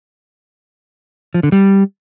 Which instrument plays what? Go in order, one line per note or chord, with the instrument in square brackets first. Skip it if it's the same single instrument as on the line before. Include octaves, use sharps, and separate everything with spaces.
[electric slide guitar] F3
D3
G3